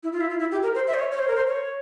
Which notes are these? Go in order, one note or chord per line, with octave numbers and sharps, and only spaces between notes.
E4
F4
E4
F4
E4
G4
A#4
C5
E5
C5
C#5
C#5
C5
A#4
C5
C#5